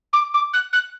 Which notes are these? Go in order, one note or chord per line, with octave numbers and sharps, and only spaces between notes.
D6
D6
F#6
F#6